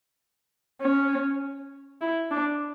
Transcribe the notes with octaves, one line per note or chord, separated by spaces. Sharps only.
C#4
E4
D4